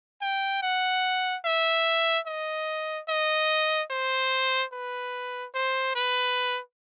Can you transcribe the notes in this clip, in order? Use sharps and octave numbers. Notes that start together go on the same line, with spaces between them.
G5
F#5
E5
D#5
D#5
C5
B4
C5
B4